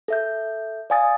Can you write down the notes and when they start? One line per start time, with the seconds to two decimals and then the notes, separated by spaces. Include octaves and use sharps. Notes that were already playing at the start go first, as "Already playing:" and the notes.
0.08 A4 E5 G6
0.90 D5 F5 G#5 D#6 A6